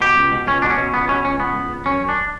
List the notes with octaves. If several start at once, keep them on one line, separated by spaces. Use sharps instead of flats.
B2 G4
C#2
B2
C#2 C#4
B2 D4
C#4
B2
C#2 B3
B2 C#4
C#2 C#4
C#2 B3
C#2
C#2
F#2 C#4
F#2
D4